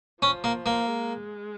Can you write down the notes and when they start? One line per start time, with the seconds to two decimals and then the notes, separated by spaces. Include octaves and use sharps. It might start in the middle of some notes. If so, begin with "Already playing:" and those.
0.22 F3 C#4
0.44 A#3
0.66 A#3
0.87 G#3